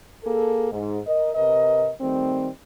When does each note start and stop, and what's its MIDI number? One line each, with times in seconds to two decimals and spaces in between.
0.24 0.70 58
0.24 0.70 68
0.24 0.70 69
0.72 0.99 44
1.06 1.32 70
1.06 1.32 75
1.35 1.90 48
1.35 1.90 70
1.35 1.90 71
1.35 1.90 75
2.01 2.48 51
2.01 2.48 55
2.01 2.48 57
2.01 2.48 60